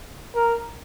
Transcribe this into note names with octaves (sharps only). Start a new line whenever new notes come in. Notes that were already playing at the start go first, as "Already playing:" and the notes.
A#4